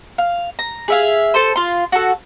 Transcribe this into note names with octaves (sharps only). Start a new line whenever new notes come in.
F5
A#5
G#4 E5 F5
A4 C5
F4 C6
F#4 A4